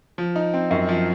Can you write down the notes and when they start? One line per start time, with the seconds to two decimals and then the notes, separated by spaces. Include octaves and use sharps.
0.18 F3
0.36 D#4
0.53 C4
0.71 F#2
0.89 F3